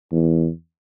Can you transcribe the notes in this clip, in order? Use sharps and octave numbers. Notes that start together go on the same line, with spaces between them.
E2